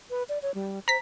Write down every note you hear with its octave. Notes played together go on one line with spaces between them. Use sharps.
B4
D5
C#5
G3
C5 A#5 B6